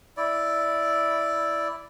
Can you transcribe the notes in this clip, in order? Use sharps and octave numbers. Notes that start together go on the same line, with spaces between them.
E4 D5